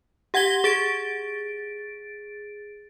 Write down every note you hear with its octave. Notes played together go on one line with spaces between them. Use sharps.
G4 F#5 G#6 A#6 G7
G#4 A6 D7